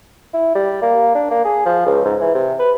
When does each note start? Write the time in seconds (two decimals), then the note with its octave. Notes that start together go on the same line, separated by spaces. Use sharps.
0.33 E4
0.55 G3
0.82 A#3
1.15 D4
1.31 A#3
1.45 G#4
1.66 F3
1.86 C#2
2.05 G#2
2.20 E3
2.35 C3
2.59 B4